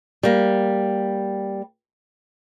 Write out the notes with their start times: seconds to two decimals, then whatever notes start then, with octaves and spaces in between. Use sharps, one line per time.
0.23 G3 A#3